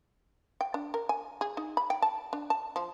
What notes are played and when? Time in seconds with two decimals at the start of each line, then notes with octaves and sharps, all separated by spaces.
0.61 G5
0.74 D4
0.94 A#4
1.09 G#5
1.41 G#4
1.57 D#4
1.77 B5
1.90 G5
2.02 A5
2.33 D4
2.50 A5
2.76 F3